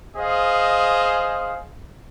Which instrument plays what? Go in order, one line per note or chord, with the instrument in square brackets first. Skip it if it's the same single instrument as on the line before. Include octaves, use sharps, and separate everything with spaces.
[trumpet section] G#4 C5 D#5 F5